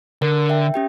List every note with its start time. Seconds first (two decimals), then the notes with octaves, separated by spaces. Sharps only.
0.22 D3 A#4
0.49 E5 G5
0.74 C#4 G4 G5